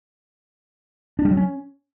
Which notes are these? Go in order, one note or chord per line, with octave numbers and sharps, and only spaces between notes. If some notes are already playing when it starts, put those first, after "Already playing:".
D4
G3
F#3
C#4